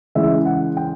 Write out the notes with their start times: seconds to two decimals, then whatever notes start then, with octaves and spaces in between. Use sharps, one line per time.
0.15 C#3 E3 G#3 E5
0.45 F#5
0.77 G5